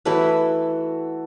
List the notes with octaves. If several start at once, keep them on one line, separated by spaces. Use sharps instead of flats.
E3 A3 E4 F#4 A4 B4